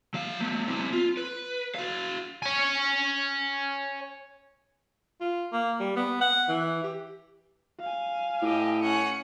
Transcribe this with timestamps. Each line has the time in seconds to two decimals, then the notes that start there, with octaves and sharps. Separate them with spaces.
0.14 F#3 F5
0.40 A3 B3
0.68 C4 E4
0.93 F4
1.17 B4
1.75 F#4 F5
2.42 C#5 G#5
5.21 F4
5.52 A#3
5.80 G3
5.97 B3
6.21 F#5
6.49 E3
6.83 G4
7.80 F5 G#5
8.42 A2 G4 D#5
8.82 C#4 F#5 C#7